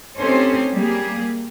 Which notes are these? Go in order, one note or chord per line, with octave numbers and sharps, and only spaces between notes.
C4 C#4 D#4 G4 A4 C5
G3 A#3 G4 G#4